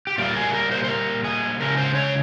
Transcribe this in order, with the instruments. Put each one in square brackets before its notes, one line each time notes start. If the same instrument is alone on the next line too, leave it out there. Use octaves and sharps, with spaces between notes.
[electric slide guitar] G4
A#2 G3 A#3 F4
G#4
A#4
C5
C5
A#4
G#4
C#3 F3 G#3 A#4
C5
C#5